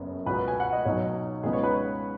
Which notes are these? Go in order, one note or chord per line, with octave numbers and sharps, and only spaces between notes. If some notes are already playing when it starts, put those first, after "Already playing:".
Already playing: F#1 F#2 C#3 B3
C#2 B2 B3 B4
G#5
F#5
D#5
B1 B2 F#3 D#4 C#5
C#2 C#3 G#3 B3 D#4 G#4
C#5
B4
C#5